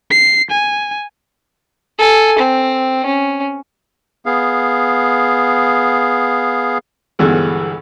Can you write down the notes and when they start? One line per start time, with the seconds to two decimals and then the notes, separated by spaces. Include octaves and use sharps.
0.11 C7
0.51 G#5
1.99 A4 G#5
2.39 C4
3.06 C#4
4.26 B3 G#4 F5
7.19 B1 G2 D3 E3 G#3